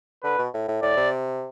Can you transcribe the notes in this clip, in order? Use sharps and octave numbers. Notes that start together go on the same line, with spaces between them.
D3 B4
B2
A2
A2
A2 D5
C3